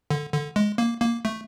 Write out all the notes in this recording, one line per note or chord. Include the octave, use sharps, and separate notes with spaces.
D3
D3
G#3
A#3
A#3
A3